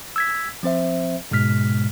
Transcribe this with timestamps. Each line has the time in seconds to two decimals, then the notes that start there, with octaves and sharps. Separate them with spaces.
0.16 E6 G#6 B6
0.63 F3 C4 C5 E5
1.31 G#2 B2 G#3 F6 B6